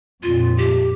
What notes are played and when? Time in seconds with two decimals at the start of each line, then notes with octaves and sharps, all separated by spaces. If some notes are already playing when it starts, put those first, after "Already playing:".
0.23 F2 A#2 F4
0.57 G4